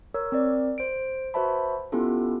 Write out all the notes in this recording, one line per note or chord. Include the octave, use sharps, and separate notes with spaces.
A#4 C#5 E6
C4 A#4 D5
C5 D7
F#4 B4 C5 E5 A5 B5
B3 C#4 E4 F4 G4 A4